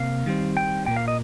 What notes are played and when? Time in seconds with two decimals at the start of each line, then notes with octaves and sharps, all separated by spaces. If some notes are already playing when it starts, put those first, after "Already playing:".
Already playing: C3 A#3 F5
0.26 D#3 G3 C4
0.57 G5
0.86 A#2 A#3 G5
0.96 F5
1.08 D#5